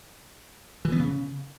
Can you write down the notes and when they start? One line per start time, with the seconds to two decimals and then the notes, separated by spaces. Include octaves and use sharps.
0.85 E3
0.92 B3
0.99 C#3